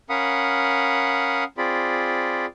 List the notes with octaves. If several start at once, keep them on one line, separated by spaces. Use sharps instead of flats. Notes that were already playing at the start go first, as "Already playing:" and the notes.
C#4 A#4 F5 F#5 B5 D#6
C4 F4 G#4 D5 B5